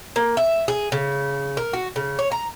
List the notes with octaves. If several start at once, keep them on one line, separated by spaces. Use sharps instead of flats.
A#3
E5
G#4
C#3
A#4
F#4
C#3
C#5
A#5